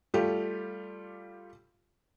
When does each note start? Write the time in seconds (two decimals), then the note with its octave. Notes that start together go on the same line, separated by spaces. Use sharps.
0.14 G3 A3 F4 G4